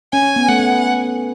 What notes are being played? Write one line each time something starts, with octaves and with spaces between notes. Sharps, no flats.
C#4 G#5
B3
A3 F#5
B3